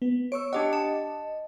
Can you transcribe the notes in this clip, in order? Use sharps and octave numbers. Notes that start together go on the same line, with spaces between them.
B3
C#5 C#6 E6 D7
D4 G4 D#5 F#5
A5